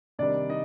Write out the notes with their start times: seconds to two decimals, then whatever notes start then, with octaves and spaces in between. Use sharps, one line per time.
0.19 C3 D#3 G3 D4 D5
0.49 D#4 D#5